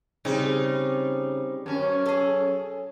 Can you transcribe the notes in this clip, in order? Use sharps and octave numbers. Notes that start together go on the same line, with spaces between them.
C#3 G3 C4 D#4
F#2 C#4
G#4 A4